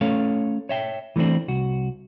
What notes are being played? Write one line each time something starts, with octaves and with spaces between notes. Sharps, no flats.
A3 C#4 A4 C#5 F5
C#5 E5 G5
E3 A3 A#3 C4 D4
C2 F#4